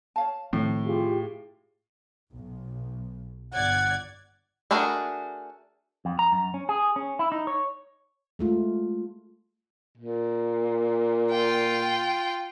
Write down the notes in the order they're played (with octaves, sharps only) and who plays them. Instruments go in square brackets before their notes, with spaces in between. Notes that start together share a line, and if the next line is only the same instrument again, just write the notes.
[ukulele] C#5 F5 A5
[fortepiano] A2 [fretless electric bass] D#3 F3 C4
[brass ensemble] F4 G4 G#4
[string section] B1
[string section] G1 D5 G#6 [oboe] F#5
[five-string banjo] A3 D4 F#4 G#4 A#4
[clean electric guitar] F2
A#5
F#2
C#4
G#4
C#4
E4
D#4
C#5
[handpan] G#3 A3 F4
[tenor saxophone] A#2
[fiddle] F4 G5